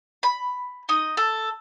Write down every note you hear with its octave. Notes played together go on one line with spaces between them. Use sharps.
B5
D#4 D#5 D#6
A4